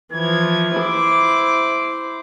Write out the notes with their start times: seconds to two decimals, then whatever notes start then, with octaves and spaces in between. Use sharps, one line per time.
0.13 E3 F3 G#6
0.78 E4 C5 D6